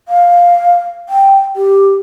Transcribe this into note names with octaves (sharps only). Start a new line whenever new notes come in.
F5
G5
G4